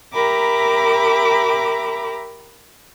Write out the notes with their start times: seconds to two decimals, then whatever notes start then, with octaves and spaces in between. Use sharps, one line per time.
0.13 G4 A#4 E5 A#5 B5 D6